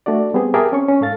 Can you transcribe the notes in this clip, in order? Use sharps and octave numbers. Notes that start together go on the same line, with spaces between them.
A3 D4 F#4 D5
G3 B3 C4 G4 G#4
G4 G#4 A#4 E5 G5 A5
C4 C#4 C#6
C#4
G#2 A4 F5 A6